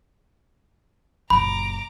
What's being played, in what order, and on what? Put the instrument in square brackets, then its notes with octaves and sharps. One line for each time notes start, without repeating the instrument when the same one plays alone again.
[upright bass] F#1 A#2 [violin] A#5 D6 [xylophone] B5